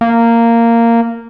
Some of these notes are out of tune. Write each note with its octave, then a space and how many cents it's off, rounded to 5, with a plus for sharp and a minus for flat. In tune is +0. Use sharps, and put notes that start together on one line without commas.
A#3 -10